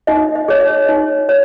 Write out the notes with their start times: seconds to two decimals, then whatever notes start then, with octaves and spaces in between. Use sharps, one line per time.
0.07 D#4 D#5
0.35 D#5
0.48 G#4 C#5
0.61 D#5
0.89 D#4
1.29 C#5